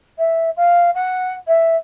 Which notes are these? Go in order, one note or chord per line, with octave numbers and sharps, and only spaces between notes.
E5
F5
F#5
E5